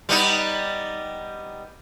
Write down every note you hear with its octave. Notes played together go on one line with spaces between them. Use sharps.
G3 B3 D#4